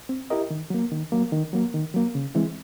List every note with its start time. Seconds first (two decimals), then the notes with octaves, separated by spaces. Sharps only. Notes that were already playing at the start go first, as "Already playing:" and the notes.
0.09 C4
0.30 E4 G4 A#4 D#5
0.50 D#3
0.70 F#3 A#3
0.92 D#3
1.12 F#3 A#3
1.32 D#3
1.53 F#3 A#3
1.74 D#3
1.94 F#3 A#3
2.15 C#3
2.35 E3 G#3 C4 E4